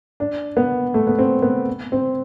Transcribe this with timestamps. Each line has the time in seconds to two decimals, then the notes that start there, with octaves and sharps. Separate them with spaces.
0.20 D4
0.57 B3
0.94 A3
1.07 B3
1.19 C4
1.42 B3
1.92 C4